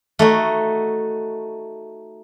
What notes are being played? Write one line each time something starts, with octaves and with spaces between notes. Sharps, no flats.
A3 D#4 F#4